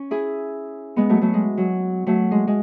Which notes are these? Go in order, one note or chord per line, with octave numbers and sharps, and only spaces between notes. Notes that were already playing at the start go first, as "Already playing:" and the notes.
Already playing: C#4
E4 G#4
G#3 B3
F#3 A3
F#3 A3
G#3
F#3
F#3 A3
G#3
G#3